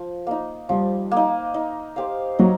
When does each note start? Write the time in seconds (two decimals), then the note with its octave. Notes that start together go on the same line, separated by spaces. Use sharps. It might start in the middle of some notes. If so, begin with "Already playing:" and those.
Already playing: F3
0.27 A#3 D#4
0.69 F3 G3
1.11 A#3
1.17 D#4
1.54 D#4
1.96 G4 C5 F5
2.39 F#3 D#4